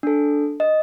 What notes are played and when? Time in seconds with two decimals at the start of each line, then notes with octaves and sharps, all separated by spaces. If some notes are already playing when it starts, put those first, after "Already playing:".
0.03 D4 A4
0.60 D#5